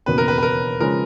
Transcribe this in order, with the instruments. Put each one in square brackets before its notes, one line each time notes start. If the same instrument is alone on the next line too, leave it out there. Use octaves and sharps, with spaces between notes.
[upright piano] E1 D#2 C#3 F#3 B3 [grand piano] B4
[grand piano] A#4
B4
B4
A#4
[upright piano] C#3 F3 G#3 [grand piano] A#4